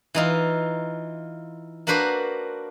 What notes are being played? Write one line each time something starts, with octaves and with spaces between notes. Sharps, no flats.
E3 D#4 F4
A#3 D4 F#4 B4 C5